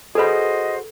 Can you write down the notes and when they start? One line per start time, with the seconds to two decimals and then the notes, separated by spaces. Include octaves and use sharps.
0.15 F#4 G#4 A4 B4 C5 D#5 B5